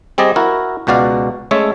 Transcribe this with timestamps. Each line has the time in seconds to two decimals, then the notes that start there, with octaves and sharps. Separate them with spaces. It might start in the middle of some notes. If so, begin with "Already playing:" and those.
0.18 G3 C4 G#4 D5 D#5
0.36 E4 F#4 A#4
0.87 C#2 B2 F#4 D5 F5
1.51 G#3 A3 C#4 A4 C#5 E5